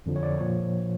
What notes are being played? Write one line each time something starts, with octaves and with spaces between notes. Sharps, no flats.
F2 D3 F3
C#5
D5
A#2 F3 C#5